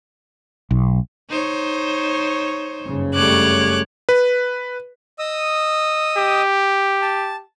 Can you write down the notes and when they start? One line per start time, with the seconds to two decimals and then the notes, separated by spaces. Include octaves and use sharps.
0.71 B1
1.29 D#4 C5 C#5
2.84 F#1 G2 C#3
3.15 G3 A3 C#5 D6 F#6
4.09 B4
5.19 D#5 D#6 E6
6.17 G4
7.02 A5